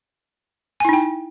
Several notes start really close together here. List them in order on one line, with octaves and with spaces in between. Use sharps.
G#5 E4 D#4 G5